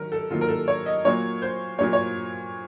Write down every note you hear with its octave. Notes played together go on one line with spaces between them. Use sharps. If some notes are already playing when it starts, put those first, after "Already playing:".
Already playing: D#3 F#3 A#4
A4
D#3 F#3 A#3 F4
A#4
A4
C#5
D#5
A#2 F#3 A#3 C#5
C5
A#2 F#3 A#3 C#5
C#5